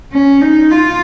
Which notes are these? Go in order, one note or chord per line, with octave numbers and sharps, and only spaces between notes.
C#4
D#4
F4